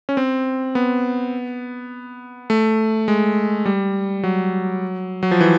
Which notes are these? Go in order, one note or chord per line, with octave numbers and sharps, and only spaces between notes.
C#4
C4
B3
A3
G#3
G3
F#3
F#3
F3
E3